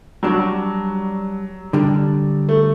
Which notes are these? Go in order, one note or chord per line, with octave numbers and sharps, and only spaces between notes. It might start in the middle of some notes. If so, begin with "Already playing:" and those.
F#3 G3 D4 F#4
D3 G3 D4
A3